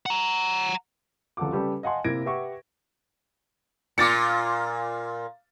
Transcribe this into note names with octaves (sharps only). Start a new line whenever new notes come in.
F#5 A#5
F1 C#2 A4 F#5 D6
C#3 G3 G4 A4 B4
D#5 F5 F#5 G#5 A5 C6
C3 A#3 E4 G#6 A#6 D7
G4 B4 E5 F#5 C#6
A#2 F4 D6 A6 C#7